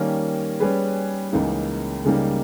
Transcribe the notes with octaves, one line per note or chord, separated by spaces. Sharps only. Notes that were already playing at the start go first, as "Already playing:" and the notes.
Already playing: D#3 G3 A#3 C#4
G3 C#4 G#4 B4
C#2 C#3 E3 A#3 D#4
C#2 C#3 G3 A#3 D#4